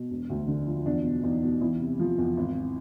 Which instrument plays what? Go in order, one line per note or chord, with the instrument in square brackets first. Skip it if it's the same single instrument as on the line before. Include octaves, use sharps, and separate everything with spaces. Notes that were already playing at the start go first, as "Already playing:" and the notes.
Already playing: [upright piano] B2
E1
D2
D3
F3
E2 D4
B2
E2 D#4
B2
E2 E4
C3
F3
E2
G#1